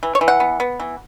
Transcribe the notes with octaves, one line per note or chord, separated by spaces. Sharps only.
E3
C#5
E3
F#5
B3
B3
E3